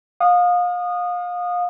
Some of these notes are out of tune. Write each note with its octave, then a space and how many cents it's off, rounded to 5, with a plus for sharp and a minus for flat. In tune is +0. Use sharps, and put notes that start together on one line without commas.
F5 +30 D#6 -20